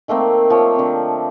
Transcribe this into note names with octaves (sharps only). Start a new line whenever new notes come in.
D#3 A3 A#3 C4
F3 C#5
D3 C4